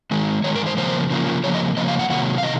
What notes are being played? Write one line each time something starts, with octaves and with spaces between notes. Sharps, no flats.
D#3 G#3
D#3 G#3 C#5
A#4
C5
C#3 F3 A#3 C5
C#3 F3 A#3
C#3 F3 A#3 C#5
D#5
C#3 F3 A#3 D#5
F5
F#5
C3 D#3 F#3 A#3 F#5
F5
C3 D#3 D#5